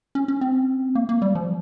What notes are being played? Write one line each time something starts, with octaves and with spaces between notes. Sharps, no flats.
C#4
C#4
C4
A#3
A#3
G3
F3